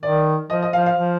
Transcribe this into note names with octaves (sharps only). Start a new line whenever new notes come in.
D#3 D5
F3 D#5
D#5
F3 F5
F5
F3